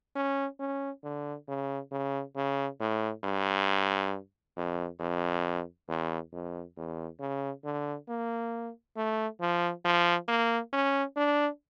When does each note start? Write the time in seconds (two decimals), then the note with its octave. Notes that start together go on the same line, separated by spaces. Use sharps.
0.16 C#4
0.60 C#4
1.04 D3
1.48 C#3
1.92 C#3
2.36 C#3
2.80 A2
3.24 G2
4.56 F2
5.00 F2
5.88 E2
6.33 F2
6.77 E2
7.20 C#3
7.65 D3
8.09 A#3
8.97 A3
9.41 F3
9.85 F3
10.28 A#3
10.73 C#4
11.17 D4